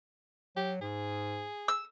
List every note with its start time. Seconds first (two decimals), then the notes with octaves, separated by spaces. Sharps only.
0.56 F#3 G4
0.81 G#2 G#4
1.68 E6